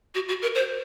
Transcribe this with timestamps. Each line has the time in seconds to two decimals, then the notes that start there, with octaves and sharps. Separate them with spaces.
0.15 F#4
0.28 F#4
0.42 A#4
0.55 C5